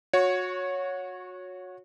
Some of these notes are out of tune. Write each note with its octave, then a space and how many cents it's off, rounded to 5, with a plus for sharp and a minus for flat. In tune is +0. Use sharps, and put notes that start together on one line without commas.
F#4 -25 C#5 +0